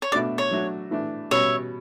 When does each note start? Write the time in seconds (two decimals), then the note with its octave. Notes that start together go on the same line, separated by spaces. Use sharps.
0.02 C#5
0.12 B2 A3 D4 F#4 D5
0.38 C#5
0.51 F#3 A3 D4 F#4
0.91 E3 A3 D4
1.31 B2 G3 C#4 C#5 E5